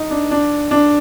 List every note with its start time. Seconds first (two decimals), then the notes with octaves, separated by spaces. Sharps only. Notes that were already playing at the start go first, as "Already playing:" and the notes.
Already playing: D#4
0.10 D4
0.31 D4
0.71 D4